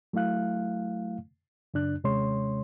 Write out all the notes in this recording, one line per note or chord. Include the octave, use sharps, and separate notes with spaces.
F#3 A3 E4 F5 F#6
F#2 C#3 D4 F#6
D#2 C3 G#3 C#4 C#5 C6